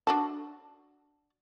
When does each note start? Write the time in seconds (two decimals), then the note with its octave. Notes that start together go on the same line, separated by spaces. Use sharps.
0.07 D4 F#4 A5